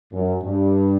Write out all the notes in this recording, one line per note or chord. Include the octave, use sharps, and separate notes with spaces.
F#2
G2